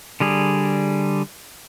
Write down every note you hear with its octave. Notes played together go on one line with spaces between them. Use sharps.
D3 G3 G#4